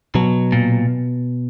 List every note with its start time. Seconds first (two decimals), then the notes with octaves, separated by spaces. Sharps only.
0.15 B2 F#3
0.52 A#2